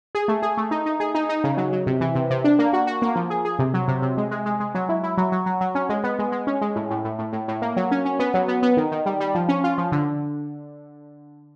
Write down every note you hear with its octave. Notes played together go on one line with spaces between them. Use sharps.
G#4
A3
G#4
A3
D#4
D#4
G#4
D#4
D#4
C#3
F#3
F#3
C3
E3
C3
C3
D4
A#3
F#4
F#4
A#3
F3
G#4
G#4
C3
F#3
C3
C3
G#3
G#3
G#3
G#3
F#3
E4
E4
F#3
F#3
F#3
F#3
C#4
G#3
B3
G#3
G#3
C#4
G#3
A2
A2
A2
A2
A2
A2
A#3
F#3
C#4
C#4
B3
F#3
B3
B3
D#3
D#3
G3
G3
F3
C#4
F4
F3
D3